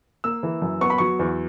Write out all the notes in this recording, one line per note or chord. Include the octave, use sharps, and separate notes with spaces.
A#3 E6
E3
F#2
B3 C#6
B5
F#3 C#6
E2